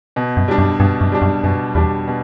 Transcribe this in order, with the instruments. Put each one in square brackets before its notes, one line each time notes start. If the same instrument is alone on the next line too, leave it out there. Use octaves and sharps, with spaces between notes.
[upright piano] B2
[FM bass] F#2
[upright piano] G3 D4
[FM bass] F#2
[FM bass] G2 [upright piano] B2
[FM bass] F#2
[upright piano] G3 D4
[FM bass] F#2
[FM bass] F#2 [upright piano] B2
[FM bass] E2 [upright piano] G3 D4
[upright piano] B2